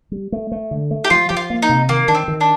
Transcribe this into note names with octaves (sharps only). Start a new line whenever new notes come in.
G3
A3
A3
D3
A3
G4
F3 F4
F3 G4
F4
A#3
D#4
C3
D#3 A#3
D#3 D4
C4
D#3
D4